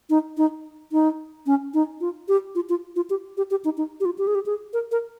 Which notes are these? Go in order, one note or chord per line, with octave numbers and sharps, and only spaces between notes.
D#4
D#4
D#4
C#4
D#4
F4
G4
F4
F4
F4
G4
G4
G4
D#4
D#4
G4
F4
G4
G#4
G4
G#4
A#4
A#4